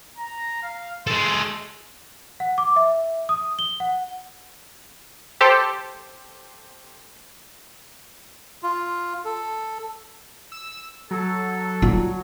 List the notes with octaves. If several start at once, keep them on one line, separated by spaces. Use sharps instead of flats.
A#5
F5
G#3 A4 C6
F#5
D6
E5
D#6
G7
F#5
G4 A4 C5
F4
A4
E6
F#3 A4
G3 F4